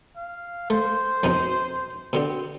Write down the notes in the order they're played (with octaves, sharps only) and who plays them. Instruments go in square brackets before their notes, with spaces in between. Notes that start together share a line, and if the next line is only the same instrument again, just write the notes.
[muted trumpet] F5
[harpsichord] A3 [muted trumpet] C5
[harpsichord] F2 B2 D#4
[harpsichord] B2 D3 G4 [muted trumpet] C4